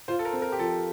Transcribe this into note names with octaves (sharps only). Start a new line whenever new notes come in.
F4 C5
A4
A#4
C4
A#4
G4
F3 A4